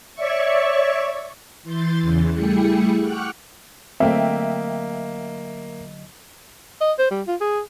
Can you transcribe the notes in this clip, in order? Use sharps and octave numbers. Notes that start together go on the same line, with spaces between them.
C#5 D5 E5 C#6
E3 C6 G6 A6
E2 C#3 E3
G3 A3 E4 G#4 G5 C#7
F#5 G5 C#6 D6 F6 F#6
D3 F#3 A3 A#3 C4 D#5 E5 G5
D#5
C5
G3
F4
G#4